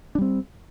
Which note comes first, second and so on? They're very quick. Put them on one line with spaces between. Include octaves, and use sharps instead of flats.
D4 G3 C4